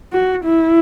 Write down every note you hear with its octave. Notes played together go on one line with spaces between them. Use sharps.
F#4
E4